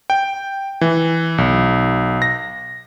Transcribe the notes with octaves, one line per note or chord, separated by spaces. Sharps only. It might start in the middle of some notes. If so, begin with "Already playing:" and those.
G5
E3
B1
A#6